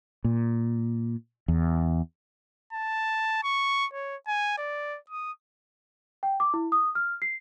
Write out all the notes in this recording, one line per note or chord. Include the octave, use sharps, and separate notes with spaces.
A#2
E2
A5
C#6
C#5
G#5
D5
D#6
G5
D6
E4
D#6
F6
C7